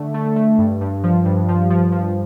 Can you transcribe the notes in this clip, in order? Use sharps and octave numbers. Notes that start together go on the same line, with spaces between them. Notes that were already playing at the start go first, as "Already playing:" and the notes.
Already playing: D3 A3
A3
A3
G2
G2
F3
G2
F3
F3
F3